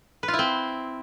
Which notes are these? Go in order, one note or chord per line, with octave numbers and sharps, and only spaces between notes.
B4
F4
E4
C4